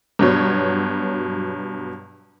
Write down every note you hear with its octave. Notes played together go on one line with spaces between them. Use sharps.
G2 B2 F#3 C#5